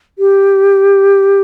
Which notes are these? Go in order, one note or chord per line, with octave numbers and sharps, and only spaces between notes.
G4